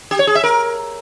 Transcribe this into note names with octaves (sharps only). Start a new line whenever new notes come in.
G4
C#5
G#4
E5
A#4